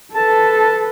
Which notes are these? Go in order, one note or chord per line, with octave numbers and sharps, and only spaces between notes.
A4 B4 A5